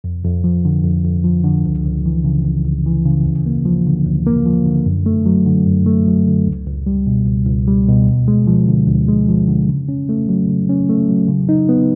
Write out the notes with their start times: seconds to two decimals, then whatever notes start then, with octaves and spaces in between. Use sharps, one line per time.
0.04 F2
0.24 F2
0.44 F3
0.65 D3
0.84 F2
1.05 F2
1.24 F3
1.44 D3
1.65 C#2
1.85 C#2
2.06 E3
2.24 C#3
2.45 C#2
2.65 C#2
2.86 E3
3.06 C#3
3.25 D2
3.46 A#3
3.66 F3
3.86 D3
4.06 D2
4.26 A#3
4.46 F3
4.66 D3
4.86 F#2
5.06 A3
5.26 F#3
5.46 D3
5.66 F#2
5.86 A3
6.07 F#3
6.27 D3
6.46 C#2
6.66 C#2
6.86 G3
7.07 B2
7.27 C#2
7.47 C#2
7.68 G3
7.88 B2
8.08 D2
8.28 G#3
8.47 F3
8.68 D3
8.87 D2
9.08 G#3
9.29 F3
9.48 D3
9.69 C#3
9.88 C#4
10.09 A3
10.29 F#3
10.49 C#3
10.69 C#4
10.89 A3
11.09 F#3
11.28 C#3
11.49 D#4
11.69 B3